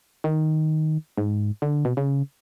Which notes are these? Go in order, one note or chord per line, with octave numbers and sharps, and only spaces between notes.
D#3
G#2
D3
B2
C#3